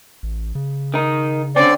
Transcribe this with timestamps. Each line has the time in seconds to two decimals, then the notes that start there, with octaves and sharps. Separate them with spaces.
0.23 A1
0.55 C#3
0.94 D#3 D#4
1.56 D3 C4 C#4 D5